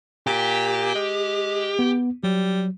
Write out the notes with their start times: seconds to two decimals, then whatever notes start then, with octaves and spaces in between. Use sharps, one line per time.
0.27 A#2 G4
0.95 G#3
1.79 B3
2.24 F#3 G3